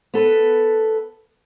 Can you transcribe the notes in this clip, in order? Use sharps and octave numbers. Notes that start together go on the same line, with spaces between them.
B3 A4 B4